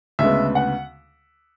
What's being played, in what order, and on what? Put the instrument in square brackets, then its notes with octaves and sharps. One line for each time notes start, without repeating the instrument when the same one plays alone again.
[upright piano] D2 C#3 G#3 B3 E5
F#5